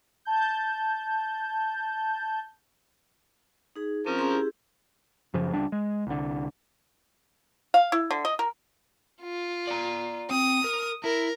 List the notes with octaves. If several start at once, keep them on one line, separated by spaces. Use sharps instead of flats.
A5 G6
D#4 G#4
F3 C4 C#4 A#4
C#4 G#4 C6
E4 G4 G#4
F#2 C#3 F3
C#2 G3 D4
G#3
C2 D3
F5
E4
D3
D#5
A#4
F4
D5 A#5
C4 D#6
A#4
E4 A#4